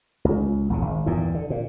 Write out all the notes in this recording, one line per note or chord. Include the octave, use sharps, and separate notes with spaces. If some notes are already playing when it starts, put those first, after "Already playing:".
C#2
A#1 E2 C#3
G#1
E2 G2 A#2
D3
A#2